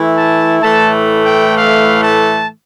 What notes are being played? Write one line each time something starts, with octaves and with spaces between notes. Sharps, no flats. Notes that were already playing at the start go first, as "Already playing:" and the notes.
Already playing: E3 A3 E4
A5
A2 E3 A3 A5
G5
F5
A5